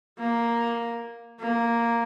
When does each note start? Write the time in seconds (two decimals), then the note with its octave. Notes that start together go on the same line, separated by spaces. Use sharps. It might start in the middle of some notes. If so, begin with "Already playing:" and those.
0.19 A#3
1.40 A#3